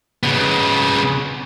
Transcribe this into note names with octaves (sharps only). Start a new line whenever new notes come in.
C#3 B3